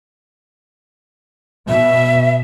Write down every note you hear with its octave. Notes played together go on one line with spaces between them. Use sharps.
B2 E5